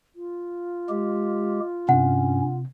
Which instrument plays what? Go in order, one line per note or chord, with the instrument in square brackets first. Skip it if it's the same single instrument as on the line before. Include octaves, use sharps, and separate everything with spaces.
[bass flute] F4
[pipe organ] G#3 G4
[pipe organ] G2 C#4 [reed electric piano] C3 [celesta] F#5